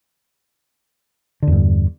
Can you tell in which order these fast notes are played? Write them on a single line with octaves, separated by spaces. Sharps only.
D3 E2 G2